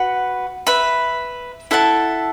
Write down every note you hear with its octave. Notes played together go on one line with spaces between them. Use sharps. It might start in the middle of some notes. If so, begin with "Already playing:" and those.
Already playing: F#4 B4 F#5
B4 E5 B5
E4 A4 F#5 A5